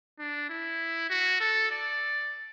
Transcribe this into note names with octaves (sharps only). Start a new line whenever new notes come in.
D4
E4
F#4
A4
D5